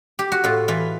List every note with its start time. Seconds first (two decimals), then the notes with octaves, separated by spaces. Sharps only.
0.19 G4
0.32 F#4
0.44 A2 F4
0.68 E3 F4